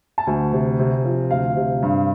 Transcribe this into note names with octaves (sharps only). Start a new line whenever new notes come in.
A5
D2 G#5
C3
C3
F3
D2 F5
C3
G2